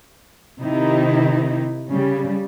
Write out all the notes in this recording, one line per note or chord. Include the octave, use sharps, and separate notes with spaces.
C3 D#3 C4 D#4 E4
C#3 G3